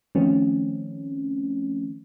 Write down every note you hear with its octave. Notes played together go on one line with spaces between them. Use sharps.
D#3 F3 A3 C4 C#4